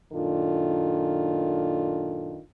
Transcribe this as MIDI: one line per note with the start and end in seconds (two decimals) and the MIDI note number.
0.12 2.39 42
0.12 2.39 46
0.12 2.39 51
0.12 2.39 62
0.12 2.39 65
0.12 2.39 69